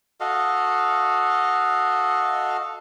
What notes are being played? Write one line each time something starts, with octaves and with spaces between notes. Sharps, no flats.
F#4 A4 D#5 F5